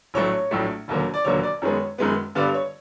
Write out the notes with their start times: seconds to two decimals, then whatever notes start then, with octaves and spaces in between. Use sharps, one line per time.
0.14 A#1 A2 F#3 A3 C#5
0.51 A#1 A2 F#3 A3
0.88 E1 D#2 D3 F#3 A#3
1.14 D5
1.25 E1 D#2 D3 F#3 A#3 C#5
1.43 D5
1.62 F#2 D#3 G#3 B3 C#5
1.98 F#2 D#3 G#3 B3
2.35 G2 D3 G3 B3 D5
2.55 C#5